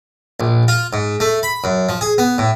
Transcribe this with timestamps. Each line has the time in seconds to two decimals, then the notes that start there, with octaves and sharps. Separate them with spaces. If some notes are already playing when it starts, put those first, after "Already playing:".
0.40 A#1
0.68 F4
0.93 G#2
1.20 A3
1.43 B5
1.64 F#2
1.89 F3
2.01 G#4
2.18 B3
2.38 A2